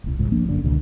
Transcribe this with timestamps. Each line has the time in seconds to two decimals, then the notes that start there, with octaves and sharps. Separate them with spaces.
0.04 D#1 C2
0.19 G#1 C#2 G#2
0.32 F3 A#3 D4
0.49 G1 F#2 D3 D4
0.63 C#2 B2 D3 D#3